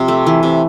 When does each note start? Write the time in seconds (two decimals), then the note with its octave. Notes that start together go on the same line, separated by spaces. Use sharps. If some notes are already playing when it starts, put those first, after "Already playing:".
Already playing: C3 F3
0.08 A3
0.27 E3
0.43 C3